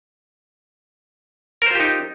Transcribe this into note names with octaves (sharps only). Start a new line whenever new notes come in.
D#4 F4 G4 A#4 C5